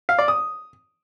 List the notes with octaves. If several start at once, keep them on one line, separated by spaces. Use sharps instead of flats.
F5
D5
D#6